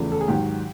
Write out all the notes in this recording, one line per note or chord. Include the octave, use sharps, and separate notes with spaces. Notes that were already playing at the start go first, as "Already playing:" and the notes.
Already playing: E2 C#3 F3 A3
A4
G#4
G#2 D#3 F#3 G4